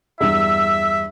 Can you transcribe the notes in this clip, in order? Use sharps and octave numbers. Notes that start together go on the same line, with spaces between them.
E2 G2 E5 E6